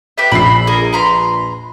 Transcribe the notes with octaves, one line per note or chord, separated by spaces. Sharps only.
G4 B4 E5
A#1 B5 E6 C7
G#4 A#4
B4 A#5 C6